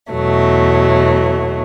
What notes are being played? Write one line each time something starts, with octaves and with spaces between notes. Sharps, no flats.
E2 B2 F#3 A3